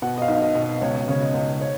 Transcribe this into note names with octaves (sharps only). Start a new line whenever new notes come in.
B2 F#5
D#5
F5
B1
D#5
B2
D#5
C#2 C#5
C#3 C#5
D#5
C#2
C#5